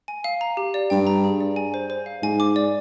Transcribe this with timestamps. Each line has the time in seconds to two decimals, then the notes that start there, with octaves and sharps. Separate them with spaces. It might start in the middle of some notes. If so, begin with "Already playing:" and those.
0.08 G#5
0.24 F5
0.41 A#5
0.57 G4
0.74 D5
0.90 G2 G5
1.07 A#5
1.24 G#4
1.41 D5
1.56 G#5
1.74 C5
1.90 C5
2.06 F5
2.22 G#2 G#5
2.40 D6
2.56 D5